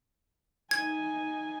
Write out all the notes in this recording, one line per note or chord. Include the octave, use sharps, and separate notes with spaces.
D#4 G#5 G#6